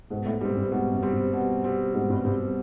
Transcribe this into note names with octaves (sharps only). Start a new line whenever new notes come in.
G#2 B2
A2
G#2 G3 C4
G2
G#2 B2
F#2
G3 C4
G2
B2
G3 C4
G#2 B2
G2
G2 G3 C4